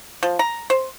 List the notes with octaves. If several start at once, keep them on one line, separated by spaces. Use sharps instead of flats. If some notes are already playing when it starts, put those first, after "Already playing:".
F3
A#5
C5